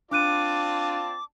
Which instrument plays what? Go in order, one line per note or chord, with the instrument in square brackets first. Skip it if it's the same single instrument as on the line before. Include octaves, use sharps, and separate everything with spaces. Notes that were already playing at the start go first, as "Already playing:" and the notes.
[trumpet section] C4 D5 A5 [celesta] D4 F#6 D#7 [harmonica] F4 [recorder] D6